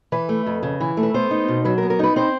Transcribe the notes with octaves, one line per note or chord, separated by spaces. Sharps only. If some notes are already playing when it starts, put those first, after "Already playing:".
E3 B4
A3
F2
C#3
E3
A3
B4
B3 C5
D#4
B2
F#3 B4
A#4
B3
A#4
D#4 B4
C4 C5